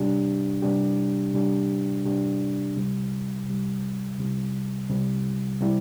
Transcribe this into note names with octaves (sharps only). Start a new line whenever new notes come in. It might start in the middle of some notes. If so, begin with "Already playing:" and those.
Already playing: C3 G3 D4 G4
C3 G3 D4 G4
C3 G3 D4 G4
C3 G3 D4 G4
C2 C3 G3
C2 C3 G3
C2 C3 G3
C2 C3 G3
C3 G3 E4 G4